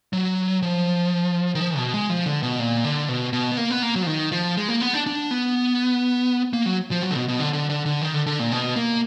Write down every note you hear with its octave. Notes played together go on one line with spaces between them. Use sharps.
F#3
F3
D#3
F3
B2
G#3
F3
D3
B2
A#2
D3
B2
B2
B3
A#3
B3
A#3
F#3
F3
D#3
F3
G#3
A#3
B3
D4
D4
B3
A#3
F#3
F3
F#3
D3
B2
B2
D3
D3
D3
D3
D#3
D3
D3
A#2
B2
A#3